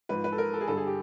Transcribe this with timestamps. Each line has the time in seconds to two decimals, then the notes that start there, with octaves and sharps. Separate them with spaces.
0.09 G#2 F3 B4
0.24 B4
0.32 A4
0.38 A#4
0.54 A4
0.61 G#4
0.68 G2 D3 G3 A4
0.77 G#4
0.87 G4